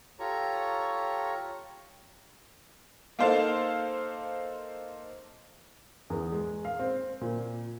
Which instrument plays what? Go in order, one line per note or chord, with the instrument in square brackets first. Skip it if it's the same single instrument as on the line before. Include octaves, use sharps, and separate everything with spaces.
[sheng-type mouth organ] F4 G4 A4 C#5 A#5 C#6
[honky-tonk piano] A#3 D#4 A4 C5 F5 A5
[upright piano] E2
G#3
F5
C4
A#2